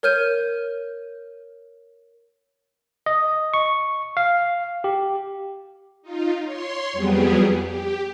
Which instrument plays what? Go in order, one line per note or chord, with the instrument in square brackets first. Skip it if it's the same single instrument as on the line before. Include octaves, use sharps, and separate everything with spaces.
[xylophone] A#4 C#5 F6 G6 D#7
[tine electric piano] D#5
C#6
F5
G4
[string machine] D#4 F4
C#5 C6
F2 F#3 G3 B3 G4 G#4
G4